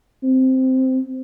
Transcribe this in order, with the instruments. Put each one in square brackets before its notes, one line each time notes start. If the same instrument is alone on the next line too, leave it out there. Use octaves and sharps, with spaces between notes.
[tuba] C4